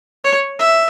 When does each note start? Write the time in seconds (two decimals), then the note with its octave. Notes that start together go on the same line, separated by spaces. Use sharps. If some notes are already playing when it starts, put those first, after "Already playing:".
0.24 C#5
0.59 E5